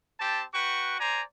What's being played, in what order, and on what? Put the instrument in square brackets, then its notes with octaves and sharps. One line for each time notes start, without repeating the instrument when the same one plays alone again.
[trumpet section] C4 G4 A5
F#4 B4 G5 C#6
C5 D5 G#5 A#5